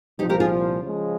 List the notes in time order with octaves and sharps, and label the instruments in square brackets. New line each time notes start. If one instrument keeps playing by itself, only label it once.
[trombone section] C2 A#2 F3 [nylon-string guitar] D#4 G4
[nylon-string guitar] G4 A#4
F4 G#4
[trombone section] C#3 F3 G#3